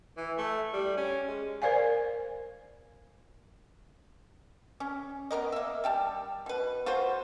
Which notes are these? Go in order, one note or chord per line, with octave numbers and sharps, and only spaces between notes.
E3
A3
G3
C#4
G#3
A#4 C5 D5 F5 G#5
C#4
B3 C#4 A#4 D#5
A#3 E5
G3 G5 A5
B2 B4
F4 F#4 B4 C5